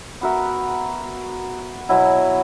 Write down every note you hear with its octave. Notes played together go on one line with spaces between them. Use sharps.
B3 F#4 A#4 E5
B2 F#3 B3 E4